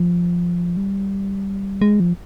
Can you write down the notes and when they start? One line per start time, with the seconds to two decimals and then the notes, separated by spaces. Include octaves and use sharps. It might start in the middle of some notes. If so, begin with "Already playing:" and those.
Already playing: F3
0.77 G3
1.81 G#3
2.00 F3